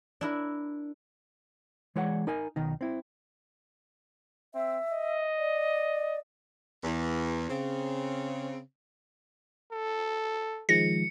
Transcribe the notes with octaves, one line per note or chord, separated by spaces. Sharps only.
D4 E4 A#4
E3 G#3 C#5 D5 F#5
D#4 A#4 G#5
B1 D#3 D#4
C4 E4
C4 E5
D#5
D5
E2
C#3 C4
A4
D#3 F3 G#3 A#6 C#7